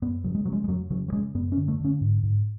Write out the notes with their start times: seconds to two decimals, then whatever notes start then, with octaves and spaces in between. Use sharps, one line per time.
0.02 F#2 B3
0.24 C#3 F#3
0.35 G#3
0.45 C#3 F#3
0.52 G#3
0.64 G#3
0.68 F2 F#3
0.90 C#3 F#3
1.08 F#3
1.12 C#3 G#3
1.34 F#2 B3
1.52 C#4
1.57 D3
1.68 A3
1.80 D3 C#4
2.01 G#2
2.23 G#2